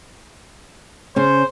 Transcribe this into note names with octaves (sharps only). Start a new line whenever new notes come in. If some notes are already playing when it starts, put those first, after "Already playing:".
C#3 C#4 C5